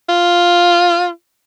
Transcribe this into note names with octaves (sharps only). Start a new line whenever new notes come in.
F4